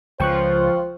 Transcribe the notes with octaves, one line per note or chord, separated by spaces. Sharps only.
C#2 F3 F4 C5 G5 C#6 F#6